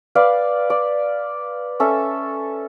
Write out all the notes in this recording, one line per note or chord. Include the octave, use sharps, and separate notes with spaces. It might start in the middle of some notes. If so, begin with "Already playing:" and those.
B4 D5 F5
D5
C#4 A4 E5